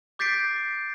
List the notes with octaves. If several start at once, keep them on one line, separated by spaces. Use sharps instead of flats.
D6 G6 A6 B6 C7 D7